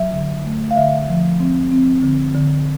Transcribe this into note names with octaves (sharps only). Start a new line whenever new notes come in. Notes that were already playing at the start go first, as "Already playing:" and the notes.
Already playing: F#3 E5
D3
A3
F5
D3 E5
F3
C4
C4
D3
D3